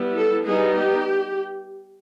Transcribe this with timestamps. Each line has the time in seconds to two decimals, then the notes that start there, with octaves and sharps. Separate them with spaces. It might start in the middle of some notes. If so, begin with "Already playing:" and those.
Already playing: G3 B3 E4
0.16 A4
0.45 G3 B3 D#4 G#4
0.74 G4